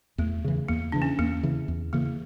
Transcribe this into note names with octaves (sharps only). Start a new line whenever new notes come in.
E2 A3
C#3 E3
E2 A#3
C#3 E3 D4
C#4
E2 A#3
C#3 E3
E2
C#3 E3 A#3